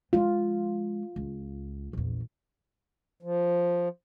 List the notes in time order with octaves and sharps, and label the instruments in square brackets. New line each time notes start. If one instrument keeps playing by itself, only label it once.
[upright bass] F3 G#3 [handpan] F4
[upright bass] C#2
A#1 E2
[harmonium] F3